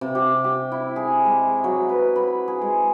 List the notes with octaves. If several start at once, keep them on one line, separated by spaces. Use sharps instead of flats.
C3
G4
G4
E4
G#4
G#3
F#3
B4
B5
G#4
G#3